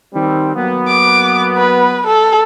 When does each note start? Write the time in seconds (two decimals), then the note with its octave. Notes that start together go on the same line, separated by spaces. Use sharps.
0.14 D#3 G3 C4
0.56 F#3 A#3 B3
0.88 D6
1.58 B4
2.07 A4